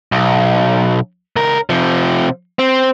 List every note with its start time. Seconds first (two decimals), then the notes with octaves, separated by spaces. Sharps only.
0.12 B1
1.36 C#2 A#4
1.70 C3 F3
2.59 C4